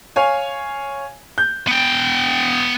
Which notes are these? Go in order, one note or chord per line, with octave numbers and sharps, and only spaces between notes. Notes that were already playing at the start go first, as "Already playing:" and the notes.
C#5 F5 G#5
G6
B3 G5